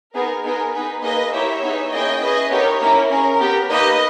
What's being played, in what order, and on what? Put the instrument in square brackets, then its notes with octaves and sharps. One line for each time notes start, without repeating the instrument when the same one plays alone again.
[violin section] B3 D#4 G#4 A#4
B3 D#4 G#4 A#4
B3 D#4 G#4 B4
A#3 D#4 G#4 B4 D#5
A#3 E4 G4 C#5 E5
B3 D#4 G#4
A#3 C#4 E4 G#4 D#5 G5
C#4 E4 G#4 B4 D#5
B3 D#4 G4 A#4 C#5
A#3 C#4 E4 A#4
C#4 G#4 A#4
B3 G4
A#3 D#4 G4 B4 D#5